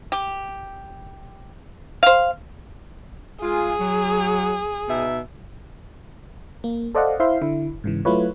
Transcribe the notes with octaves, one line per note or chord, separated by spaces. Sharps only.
G4
C5 F5
G#3 F4 G#4
F#3
B2 D#4 E5
A#3
A4 C5 D5 D#5 F5 F#5
E4 C5 E5 F5 C6
D3 E4
G#2 C#3 E3
F#3 A3 E4 F4 B4 C#5